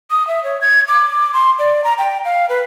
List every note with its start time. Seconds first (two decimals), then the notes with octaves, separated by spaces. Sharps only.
0.11 D#6
0.28 E5
0.44 C#5
0.61 G#6
0.88 D6
1.33 C6
1.59 D5
1.84 A#5
1.98 G5
2.25 F5
2.49 B4